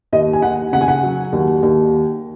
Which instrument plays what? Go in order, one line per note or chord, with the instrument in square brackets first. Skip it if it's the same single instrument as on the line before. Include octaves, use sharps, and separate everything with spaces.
[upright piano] D#2 D#5
G#5
D#2 F#5
C#3 F#5
G#5
F#5
F#3
D#2
D#2